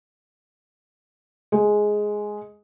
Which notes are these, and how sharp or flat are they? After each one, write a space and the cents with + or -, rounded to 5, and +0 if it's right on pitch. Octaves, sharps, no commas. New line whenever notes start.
G#3 +5